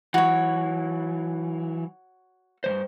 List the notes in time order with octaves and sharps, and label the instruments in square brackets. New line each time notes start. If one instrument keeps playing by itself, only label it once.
[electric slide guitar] E3 F#3 [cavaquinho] F#4 C#5
[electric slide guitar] G2 E3 C5